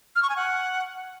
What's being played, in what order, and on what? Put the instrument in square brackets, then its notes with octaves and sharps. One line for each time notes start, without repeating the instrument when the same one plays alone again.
[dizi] F6
C#6
G#5
F#5